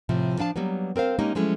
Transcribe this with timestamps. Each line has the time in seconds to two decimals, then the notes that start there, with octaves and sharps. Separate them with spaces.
0.09 A2 C3 F3
0.38 F3 D4 F5 A5
0.56 F#3 G3 A#3 B3
0.96 C4 A#4 C5 F5
1.19 G#3 A#3 C#4 D#4 G4
1.35 F3 F#3 G#3 A3 C#4 E4